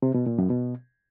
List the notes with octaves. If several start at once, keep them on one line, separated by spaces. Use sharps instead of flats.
C3
B2
A#2
F#2
B2